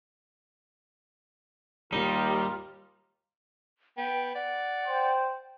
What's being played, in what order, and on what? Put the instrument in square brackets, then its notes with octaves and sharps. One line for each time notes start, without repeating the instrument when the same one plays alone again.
[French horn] D#2 [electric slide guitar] G3 [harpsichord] D#4 [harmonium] F4 A#4 A#5
[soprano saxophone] B3 [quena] G5
[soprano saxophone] D5 [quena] F#5
[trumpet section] C5 G5